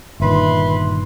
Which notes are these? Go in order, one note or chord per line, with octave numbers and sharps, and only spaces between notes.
G1 A#2 D#3 B4 E5 C6